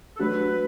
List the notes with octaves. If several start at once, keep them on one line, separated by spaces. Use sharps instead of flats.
A4
F#3 A3 D4 F#4 B4